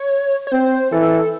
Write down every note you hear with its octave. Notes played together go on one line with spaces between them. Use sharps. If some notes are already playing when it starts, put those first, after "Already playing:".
Already playing: C#5
C#5
C4 C5
E3 A4